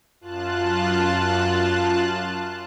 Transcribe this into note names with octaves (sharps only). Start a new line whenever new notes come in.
F#2 F4 A5 F#6